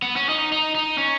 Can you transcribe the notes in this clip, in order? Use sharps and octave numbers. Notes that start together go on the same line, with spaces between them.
B3
C#4
D#4
D#4
D#4
C#4